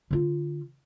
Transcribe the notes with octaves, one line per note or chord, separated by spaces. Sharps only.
D3 F4